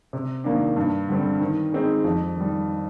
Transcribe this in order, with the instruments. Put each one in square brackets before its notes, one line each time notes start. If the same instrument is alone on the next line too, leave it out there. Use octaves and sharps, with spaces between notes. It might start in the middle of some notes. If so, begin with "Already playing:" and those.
[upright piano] C3
D#3 A#3 D4
G2
D3 G3 C4
D#3
G#3 C4 D#4
F2
D#3 G3